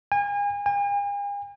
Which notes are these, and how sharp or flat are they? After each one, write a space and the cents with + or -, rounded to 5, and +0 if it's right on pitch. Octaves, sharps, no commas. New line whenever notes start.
G#5 -35
G#5 -45